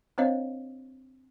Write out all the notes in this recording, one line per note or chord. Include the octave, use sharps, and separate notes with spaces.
C4 D4 C5 C#5 D#5 F5